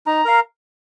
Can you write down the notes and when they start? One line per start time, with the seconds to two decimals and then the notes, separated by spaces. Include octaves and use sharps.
0.06 D#4 A#5
0.25 A#4 F5